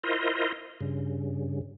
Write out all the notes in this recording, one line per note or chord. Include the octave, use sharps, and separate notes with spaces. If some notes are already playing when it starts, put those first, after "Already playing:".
E4 F4 A#4 C5 D#5
G2 C#3